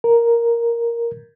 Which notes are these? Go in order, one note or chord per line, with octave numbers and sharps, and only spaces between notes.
A#4